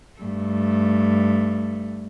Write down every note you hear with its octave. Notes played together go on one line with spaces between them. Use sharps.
G2 A3